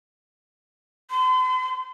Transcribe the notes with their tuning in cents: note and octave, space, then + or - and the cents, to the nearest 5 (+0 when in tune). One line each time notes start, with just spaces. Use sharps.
C6 -45